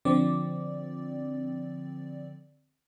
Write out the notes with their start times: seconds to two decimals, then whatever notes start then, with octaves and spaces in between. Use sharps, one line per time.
0.05 D3 F3 C4 D5